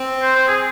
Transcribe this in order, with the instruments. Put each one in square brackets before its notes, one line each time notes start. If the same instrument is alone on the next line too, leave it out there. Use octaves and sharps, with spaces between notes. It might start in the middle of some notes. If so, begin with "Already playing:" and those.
Already playing: [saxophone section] C4
[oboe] C5
C5
G#4